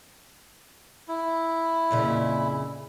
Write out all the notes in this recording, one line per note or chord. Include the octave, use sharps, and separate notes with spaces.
E4
F2 A#2 C#3